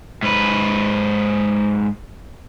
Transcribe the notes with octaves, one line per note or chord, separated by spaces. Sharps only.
G#2 B4